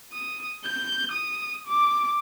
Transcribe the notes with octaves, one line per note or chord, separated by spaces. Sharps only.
D#6
G6
D#6
D6